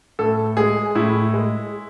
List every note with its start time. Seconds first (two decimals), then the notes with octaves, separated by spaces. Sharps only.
0.19 A2 A4
0.57 G#3 G#4
0.95 A2 E4
1.34 G#3